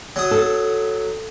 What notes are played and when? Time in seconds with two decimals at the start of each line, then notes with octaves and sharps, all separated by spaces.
0.16 F#3 D#6
0.31 A4